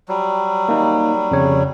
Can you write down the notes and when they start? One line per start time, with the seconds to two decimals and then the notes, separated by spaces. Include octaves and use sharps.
0.09 F#3 G3
0.69 A#3 D#4
1.31 F2 C#3 C#5